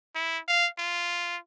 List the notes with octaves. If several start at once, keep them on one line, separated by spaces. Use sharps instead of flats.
E4
F5
F4